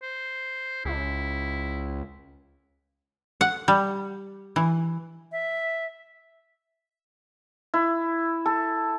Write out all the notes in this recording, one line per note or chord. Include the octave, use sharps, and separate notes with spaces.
C5
C#2 E4
F#5
G3
E3
E5
E4
A4